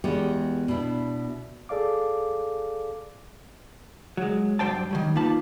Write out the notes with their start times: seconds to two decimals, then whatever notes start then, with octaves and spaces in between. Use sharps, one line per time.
0.04 E2 G#3 B3 F#4 G4
0.68 B2 D4 E4
1.69 G#4 A4 D5 F5 D6
4.17 F#3 G#3
4.59 G2 F#3 C5 G5 A5
4.91 D#3 F#3 G3
5.15 A#3 D#4 F4 B4 A5